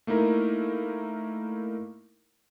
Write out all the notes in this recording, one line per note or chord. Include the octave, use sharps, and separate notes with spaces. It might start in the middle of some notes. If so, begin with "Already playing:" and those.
A3 A#3 D#4 E4 A#4